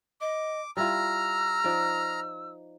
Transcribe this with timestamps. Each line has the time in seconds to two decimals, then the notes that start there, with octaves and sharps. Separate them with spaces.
0.21 D#5 D6
0.77 G3 E4 F4 A#5 E6 F6
1.64 F3 D#4 D5